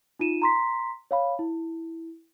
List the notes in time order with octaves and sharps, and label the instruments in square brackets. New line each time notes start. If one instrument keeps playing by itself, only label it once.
[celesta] D#4 F4 D#7 E7
A#5 C6 B6
C#5 F5 B5
E4